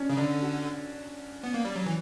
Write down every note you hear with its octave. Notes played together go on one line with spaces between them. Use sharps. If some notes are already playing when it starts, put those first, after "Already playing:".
Already playing: C#4 D4
C#3
D3 D4
F#4
B3
A#3
G3
F#3
E3